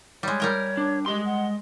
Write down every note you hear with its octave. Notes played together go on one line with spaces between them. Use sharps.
G3 G#3 C#5
G3 A#4 G5
D4
G#3 G4 D#5 C6
F#5